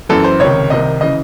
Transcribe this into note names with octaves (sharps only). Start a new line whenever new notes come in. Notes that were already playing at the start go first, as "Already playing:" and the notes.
F#2 E3 A4
C5
C#2 C3 D#3 C#5
C2 C3 D#3 D#5
C#3 E3 D#5